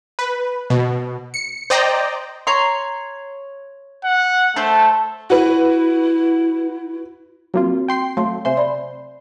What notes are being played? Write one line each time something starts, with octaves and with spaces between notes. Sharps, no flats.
B4
B2
C#7
C5 D5 D#5 G5 A#5
C#5 A#5 C6
F#5
A3 A4 C5
E4 F#4 B4
F#3 A#3 C4 F4 F#4
G5 C6 C7
F#3 A3 F5 C6
C3 C5 E5 G#5 C6
D5 B5